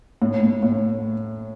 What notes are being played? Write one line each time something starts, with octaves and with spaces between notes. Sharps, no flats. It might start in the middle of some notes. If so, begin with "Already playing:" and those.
A2
A2
A2